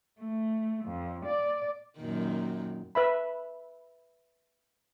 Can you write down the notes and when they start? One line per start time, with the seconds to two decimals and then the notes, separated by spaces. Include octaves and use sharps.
0.20 A3
0.85 F2
1.25 D5
1.98 F#2 A#2 D#3
2.95 B4 E5 B5